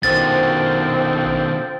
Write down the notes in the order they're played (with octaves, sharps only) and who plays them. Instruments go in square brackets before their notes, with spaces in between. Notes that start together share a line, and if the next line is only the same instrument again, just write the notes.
[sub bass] A#1 [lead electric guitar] B2 D#3 [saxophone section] D3 F3 C4 [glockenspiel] A6